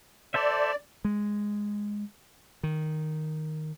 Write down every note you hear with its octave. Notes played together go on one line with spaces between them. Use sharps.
A4 C5 D5 E5
G#3
D#3